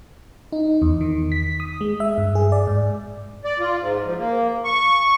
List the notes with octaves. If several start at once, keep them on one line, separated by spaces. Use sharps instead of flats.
D#4
E2
D#3
B6
D#6
G#3
E5
G2
G#4
D5
G#2
D5
F4
G#2
F3
A#3
C#6